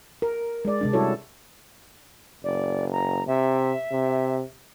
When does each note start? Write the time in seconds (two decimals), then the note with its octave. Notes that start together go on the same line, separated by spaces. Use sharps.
0.22 A#4
0.65 G#3 D5
0.81 C3 G#3 D4
0.93 G3 E4 F#4 A4 C#5
2.44 F#1 D5
2.92 A#5
3.27 C3 E5
3.92 C3